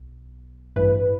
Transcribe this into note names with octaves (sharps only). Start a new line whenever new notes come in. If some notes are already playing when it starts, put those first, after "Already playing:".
Already playing: B1
A1 G2 E3 B4